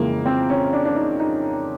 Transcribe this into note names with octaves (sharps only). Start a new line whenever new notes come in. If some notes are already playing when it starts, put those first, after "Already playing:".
Already playing: F2 C#3 E3 G#3 A#3
C4
C#4
D4
D4
D#4
D#4